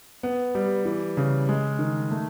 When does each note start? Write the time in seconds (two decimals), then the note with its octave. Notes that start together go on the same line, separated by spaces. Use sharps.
0.23 B3
0.55 G3
0.85 E3
1.17 C#3
1.49 G#3
1.79 D#3
2.11 A3